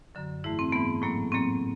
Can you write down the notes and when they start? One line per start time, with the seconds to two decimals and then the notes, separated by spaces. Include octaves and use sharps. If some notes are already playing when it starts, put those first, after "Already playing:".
0.15 F#2 D3 F#3
0.44 G#2 E3 A3 E4
0.59 C4
0.72 G#2 E3 A3 B3
1.02 A2 F#3 A#3
1.32 A2 F#3 A#3 C4